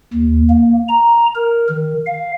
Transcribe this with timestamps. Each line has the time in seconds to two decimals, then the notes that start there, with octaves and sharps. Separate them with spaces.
0.13 D#2
0.50 A#3
0.88 A#5
1.35 A#4
1.69 D#3
2.06 F5